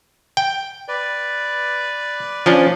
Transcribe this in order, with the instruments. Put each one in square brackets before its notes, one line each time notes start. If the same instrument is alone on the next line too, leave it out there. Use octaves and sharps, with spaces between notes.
[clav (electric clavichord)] G5
[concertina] B4 D5
[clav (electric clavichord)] F3 C#4 D4